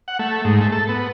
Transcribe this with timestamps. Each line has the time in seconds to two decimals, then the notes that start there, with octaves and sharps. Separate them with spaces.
0.08 F#5
0.19 A3
0.44 G#2
0.61 A3
0.72 A4
0.89 B3